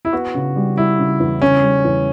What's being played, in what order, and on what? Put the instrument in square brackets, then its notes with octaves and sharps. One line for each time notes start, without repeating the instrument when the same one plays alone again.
[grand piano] E4
[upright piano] B3 [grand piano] F#4
[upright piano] C#3
G3
[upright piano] G3 [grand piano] E4
[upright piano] C#3
E2
[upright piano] C#3 [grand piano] C#4
[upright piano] G3
E2